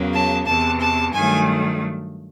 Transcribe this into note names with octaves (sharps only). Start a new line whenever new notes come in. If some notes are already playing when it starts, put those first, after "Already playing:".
Already playing: E2 C#3 F#3 A#3
A5
E2 C3 E3 A5
A5
G2 D#3 F#3 A3 G#5